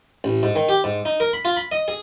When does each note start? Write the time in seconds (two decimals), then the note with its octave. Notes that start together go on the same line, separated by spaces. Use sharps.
0.24 A1
0.43 G#2
0.55 D#3
0.69 G4
0.84 G#2
1.05 D#4
1.20 A#4
1.33 B5
1.45 F4
1.57 B5
1.72 D#5
1.88 G#4